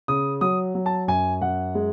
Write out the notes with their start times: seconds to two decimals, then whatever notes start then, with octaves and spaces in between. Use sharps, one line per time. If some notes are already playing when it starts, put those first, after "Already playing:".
0.08 C#3 D#6
0.41 F#3 D#6
0.75 F#3
0.86 A5
1.08 F#2 G#5
1.41 F#2 F#5
1.75 G#3